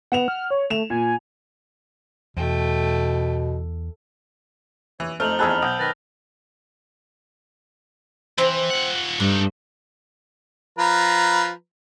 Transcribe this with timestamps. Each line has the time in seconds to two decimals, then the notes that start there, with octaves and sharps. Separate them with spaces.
0.12 B3 F#5 E7 F7
0.28 F6
0.51 C#5
0.70 A3 E7 F7
0.90 A#2 G#5
2.37 E2 B2 A3 G5
5.00 E3 C#5
5.20 F2 A3 D#4 C5 F6 F7 F#7
5.39 E2 G#4 A5 B5 E6 F#6
5.62 B1 D#6 G6
5.79 D#3 B4 A6 A#6
8.38 E3 C4
8.70 F3 F#5
9.20 G2 D4 D#4 A4
10.78 F3 B4 A#5